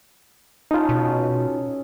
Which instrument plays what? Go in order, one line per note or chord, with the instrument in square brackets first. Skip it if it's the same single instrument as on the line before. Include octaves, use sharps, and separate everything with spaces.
[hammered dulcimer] C#4 G#4 A4 [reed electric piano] D#4 F4
[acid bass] B2